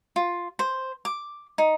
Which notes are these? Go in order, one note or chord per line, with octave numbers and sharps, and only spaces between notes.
F4
C5
D6
D#4